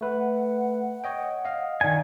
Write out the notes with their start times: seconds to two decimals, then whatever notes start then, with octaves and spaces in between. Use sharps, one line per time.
0.01 A3 B4 F#5
1.04 C#5 D#5 G5
1.45 D#5 F5
1.81 D#3 D5 G#5